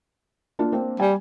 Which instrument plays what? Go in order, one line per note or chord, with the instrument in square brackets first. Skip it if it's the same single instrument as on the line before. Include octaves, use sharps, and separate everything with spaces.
[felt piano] A#3 D4 F4
A#3 C4 D4
[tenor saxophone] G3 [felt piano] G#5